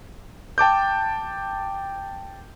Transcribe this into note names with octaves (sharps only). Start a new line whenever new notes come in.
G5 A5 D6 G6